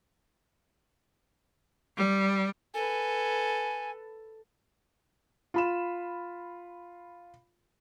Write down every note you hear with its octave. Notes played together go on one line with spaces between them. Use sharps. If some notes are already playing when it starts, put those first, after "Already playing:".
G3
A4 B4 G#5
F4 B5 E7